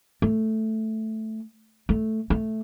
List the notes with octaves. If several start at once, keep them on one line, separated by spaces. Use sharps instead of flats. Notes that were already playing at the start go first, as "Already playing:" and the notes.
A3
A3
A3